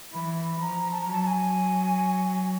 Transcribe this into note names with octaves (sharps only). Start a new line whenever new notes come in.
E3 B5
F3 A#5
A5
A#5
F#3 A5
A5
G#5